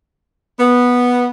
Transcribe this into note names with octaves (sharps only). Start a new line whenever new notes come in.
B3